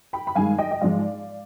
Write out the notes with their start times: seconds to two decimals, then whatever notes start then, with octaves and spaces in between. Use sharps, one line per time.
0.13 G5 B5
0.27 B5
0.35 G2 D#3 G#3 F5 G#5
0.58 D#5 G5
0.71 D#5
0.81 G#2 F3 G#3 D5 F5